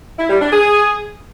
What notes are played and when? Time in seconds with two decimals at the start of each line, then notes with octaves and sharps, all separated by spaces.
0.18 E4
0.30 G3
0.41 D4
0.52 G#4